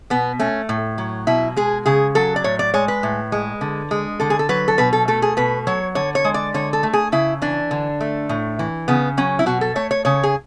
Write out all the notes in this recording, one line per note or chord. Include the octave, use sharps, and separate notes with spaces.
B2 B3
A3 C#4
A2
F#3
B2 E4
G#3 G#4
C#3 G#4
F#3 A4
D5
A2 C#5
D5
G#3 C#5
B4
A2
G#3
D3
G#3
D3 A4
G#4
A4
F#3 B4
A4
B2 B4
A4
A3 A4
G#4
B2 B4
F#3 C#5
D3 C#5
C#5
G#3
D5
D3 C#5
A4
A3
G#4
C#3 E4
E3 D4
D3
A3
A2
E3
C#3 B3
F#3 C#4
E4
B2 F#4
A4
A3 C#5
C#5
C#3 C#5
G#4